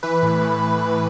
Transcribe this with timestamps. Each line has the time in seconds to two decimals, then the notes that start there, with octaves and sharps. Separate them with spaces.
0.03 E3 B4
0.22 A2
0.41 A2